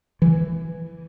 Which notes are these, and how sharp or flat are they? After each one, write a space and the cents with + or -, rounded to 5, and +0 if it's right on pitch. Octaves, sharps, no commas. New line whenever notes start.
E3 +5